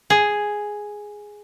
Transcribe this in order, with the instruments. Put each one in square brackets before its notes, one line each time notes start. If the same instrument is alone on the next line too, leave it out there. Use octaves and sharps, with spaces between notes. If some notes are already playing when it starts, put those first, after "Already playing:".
[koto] G#4